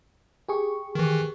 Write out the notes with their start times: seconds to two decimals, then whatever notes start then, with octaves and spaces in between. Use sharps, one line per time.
0.48 G4 G#4 C#6
0.95 D#3 E3